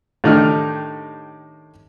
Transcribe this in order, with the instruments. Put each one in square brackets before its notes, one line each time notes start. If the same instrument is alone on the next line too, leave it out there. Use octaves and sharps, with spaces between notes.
[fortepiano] A2 D#3 D4 D#4 G4 F6